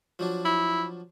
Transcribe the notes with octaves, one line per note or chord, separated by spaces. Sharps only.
F3 F#3 D4
E4